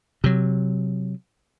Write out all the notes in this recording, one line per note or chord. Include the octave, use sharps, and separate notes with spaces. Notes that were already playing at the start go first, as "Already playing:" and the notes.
C3 F#3